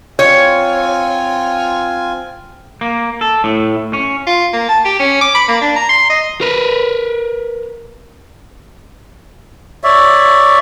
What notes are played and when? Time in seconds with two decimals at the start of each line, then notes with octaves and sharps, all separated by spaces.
0.19 C4 F4 C#5 G#5
2.81 A#3
3.21 A4
3.44 A2
3.93 C#4
4.27 F4
4.53 A#3
4.69 A5
4.85 G4
4.99 C#4
5.21 D6
5.35 B5
5.48 A#3
5.61 D4
5.76 A#5
5.89 C6
6.10 D#5
6.41 A#4 B4
9.84 C#5 D5 E5